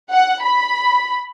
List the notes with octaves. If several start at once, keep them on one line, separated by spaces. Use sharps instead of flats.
F#5
B5